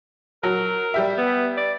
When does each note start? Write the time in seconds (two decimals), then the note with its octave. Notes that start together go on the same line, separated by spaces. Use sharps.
0.43 F#3 A#4
0.94 G3 G4 E5
1.18 B3
1.57 D5